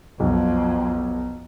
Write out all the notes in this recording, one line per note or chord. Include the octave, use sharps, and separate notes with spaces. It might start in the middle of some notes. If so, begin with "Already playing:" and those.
B1 F2